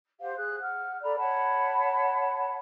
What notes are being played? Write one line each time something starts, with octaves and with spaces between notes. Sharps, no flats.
G4 C5 F5 F#5
G#4 F#6
F#5 F6
A4 D5 A#5 B5
C#5 F#5 A5 B5